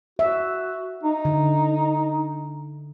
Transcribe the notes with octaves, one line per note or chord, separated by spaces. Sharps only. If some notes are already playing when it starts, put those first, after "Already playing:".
F#4 E5
D#4
D3